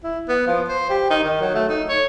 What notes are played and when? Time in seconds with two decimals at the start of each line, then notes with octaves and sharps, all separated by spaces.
0.04 E4
0.28 B3
0.47 F3
0.68 C5
0.89 G4
1.10 D#4
1.24 D#3
1.41 F#3
1.54 A3
1.69 D#4
1.88 C#5